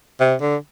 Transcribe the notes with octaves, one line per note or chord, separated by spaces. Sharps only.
C3
D3